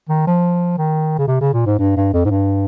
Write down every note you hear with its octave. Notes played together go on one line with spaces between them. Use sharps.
D#3
F3
D#3
C#3
C3
C#3
A#2
G#2
G2
G2
F2
G#2
G2